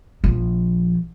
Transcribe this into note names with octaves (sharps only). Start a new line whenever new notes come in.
A#1 F3